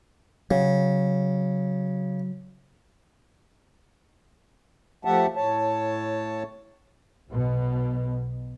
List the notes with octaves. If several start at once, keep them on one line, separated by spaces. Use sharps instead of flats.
C#3 F#3
F3 A3 G4 E5 F#5 A5
A2 C#5 A5
B1 B2